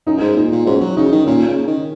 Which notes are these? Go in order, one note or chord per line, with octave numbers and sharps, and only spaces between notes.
F#2 D#4
G#2
A#2 D#4
A#2
G#2 C#4 F#4
F#3
C#3 D#4
D#3
A#2 C#4
C#3
D#3